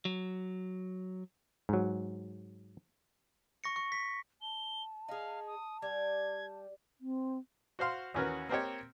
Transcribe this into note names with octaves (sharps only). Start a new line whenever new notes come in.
F#3
G#2 F#3
C#6 A#6 C#7
C#6
B6
A5 G7
D#4 G#4 F5
D#6
G3 G#6
C4
F#4 C5 F5 C6
D#2 E3 C#4 F#4 A#4 B4
A#3 C4 G4 C#5